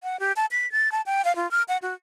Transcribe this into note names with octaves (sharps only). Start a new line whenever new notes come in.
F#5
G4
A5
B6
A6
A5
G5
F5
F4
F6
F#5
F#4